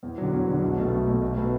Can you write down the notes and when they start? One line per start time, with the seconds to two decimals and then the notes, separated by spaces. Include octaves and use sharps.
0.03 E2
0.18 D3 F#3
0.33 E2
0.47 D3 F#3
0.62 B1
0.77 B2 A3
0.92 B1
1.07 B2 A3
1.22 B1
1.36 B2 A3 F#4 B4